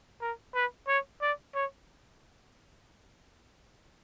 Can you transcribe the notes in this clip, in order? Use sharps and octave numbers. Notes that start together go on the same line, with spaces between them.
A#4
B4
C#5
D5
C#5